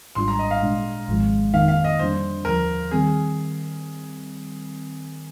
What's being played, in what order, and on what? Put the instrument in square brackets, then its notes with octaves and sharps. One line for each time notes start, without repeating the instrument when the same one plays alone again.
[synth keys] G#1 G#2 G3 D4 F4 [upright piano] C6
[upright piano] A#5
D#5
F5
[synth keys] A#2 G#3 D4
G#1 G#2 F3 G#3
[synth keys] F2 D#3 A#3 D#4 [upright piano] F5
[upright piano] F5
D#5
[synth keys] F2 D3 G3 D4 [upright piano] C5
[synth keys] D#2 D3 F3 [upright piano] A#4
[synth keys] D#3 G3 C4 [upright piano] G#4